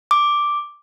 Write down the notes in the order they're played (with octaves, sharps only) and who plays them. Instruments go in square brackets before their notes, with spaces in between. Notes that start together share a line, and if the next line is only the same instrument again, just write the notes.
[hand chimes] D6